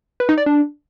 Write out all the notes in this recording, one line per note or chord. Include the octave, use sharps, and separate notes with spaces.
B4
D#4
D5
D4